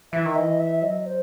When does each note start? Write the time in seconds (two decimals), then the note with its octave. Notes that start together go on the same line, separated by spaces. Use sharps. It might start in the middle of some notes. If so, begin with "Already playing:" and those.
0.13 E3 E5
0.25 D#3
0.35 E3 D#5
0.60 E5
0.82 F#3 D#5
1.06 C5